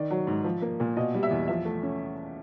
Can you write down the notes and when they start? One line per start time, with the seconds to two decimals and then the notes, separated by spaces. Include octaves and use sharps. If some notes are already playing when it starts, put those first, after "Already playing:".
Already playing: D#3 D5
0.11 F#3
0.27 G#2
0.44 F3
0.62 A#3
0.80 A#2
0.97 B2 D#5
1.14 G3
1.23 E5
1.31 E2
1.48 F3 E5
1.65 A3
1.83 C#4